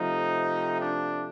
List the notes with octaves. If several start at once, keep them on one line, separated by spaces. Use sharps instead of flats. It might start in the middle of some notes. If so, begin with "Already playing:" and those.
Already playing: C3 F3 A3 D#4
D4